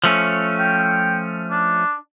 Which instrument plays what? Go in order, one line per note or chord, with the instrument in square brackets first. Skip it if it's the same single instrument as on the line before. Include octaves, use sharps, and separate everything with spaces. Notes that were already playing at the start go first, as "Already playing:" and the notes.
[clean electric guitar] F3 A3 C#4
[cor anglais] G5
D4